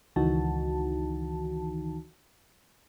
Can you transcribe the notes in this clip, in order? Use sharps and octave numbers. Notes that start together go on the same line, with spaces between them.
C#2 D#3 E3 D#4 F#4 A5